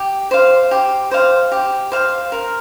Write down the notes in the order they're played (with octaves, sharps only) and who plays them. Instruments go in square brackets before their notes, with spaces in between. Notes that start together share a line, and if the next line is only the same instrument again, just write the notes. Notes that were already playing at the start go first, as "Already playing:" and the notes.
Already playing: [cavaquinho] G4
C5 F5
G4
C5 F5
G4
C5 F5
A#4